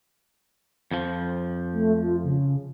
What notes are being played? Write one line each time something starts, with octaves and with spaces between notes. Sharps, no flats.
F2 F3
A3
F4
C#3